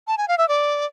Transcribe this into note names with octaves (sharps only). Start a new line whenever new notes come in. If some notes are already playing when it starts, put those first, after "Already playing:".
A5
G#5
F5
E5
D5